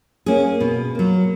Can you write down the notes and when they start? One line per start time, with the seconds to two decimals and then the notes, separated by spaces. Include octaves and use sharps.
0.26 A#3 C#4 G#4
0.60 B2
0.95 F#3 A#3